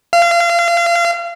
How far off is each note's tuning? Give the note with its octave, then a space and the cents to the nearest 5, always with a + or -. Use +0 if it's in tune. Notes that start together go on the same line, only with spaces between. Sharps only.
F5 -30